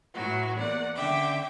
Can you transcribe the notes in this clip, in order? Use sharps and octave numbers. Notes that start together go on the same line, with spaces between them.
A2 E3 F#3 F#4
E2 A#3 D5 F#5
D3 C#4 E5 G5 D6